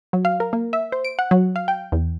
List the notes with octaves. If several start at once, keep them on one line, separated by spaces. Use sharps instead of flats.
F#3
F5
A#4
A#3
E5
C5
D7
F#5
F#3
F5
G5
E2